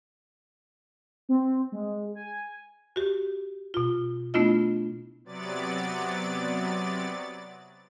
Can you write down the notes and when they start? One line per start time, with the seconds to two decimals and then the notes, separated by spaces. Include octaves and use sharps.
1.29 C4
1.72 G#3
2.15 G#5
2.96 F#4 G4
3.74 B2 F4
4.34 A3 B3 D4 E4 F4 D#5
5.24 C3 F#3 B3 D5 A6